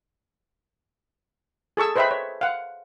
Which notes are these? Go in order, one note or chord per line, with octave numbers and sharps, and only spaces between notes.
G#4 A4 C#6 E6
B4 C5 D#5 E5 G5 B5
C#5
F5 F#5